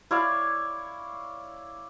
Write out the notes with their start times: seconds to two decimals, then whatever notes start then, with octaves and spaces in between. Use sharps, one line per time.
0.11 E4 C#5 D5 F5